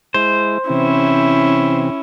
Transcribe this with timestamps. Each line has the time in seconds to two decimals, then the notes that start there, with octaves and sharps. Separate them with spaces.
0.14 G#3 E4 C5
0.69 C3 E3 C4 C#4 E4